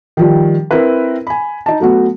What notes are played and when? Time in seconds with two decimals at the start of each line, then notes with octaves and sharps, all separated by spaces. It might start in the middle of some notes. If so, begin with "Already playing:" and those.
0.17 D#3 F3 G3
0.71 C4 E4 A#4 B4
1.27 G#5 B5
1.66 D#4 A5
1.80 F#3 A3 B3 F#4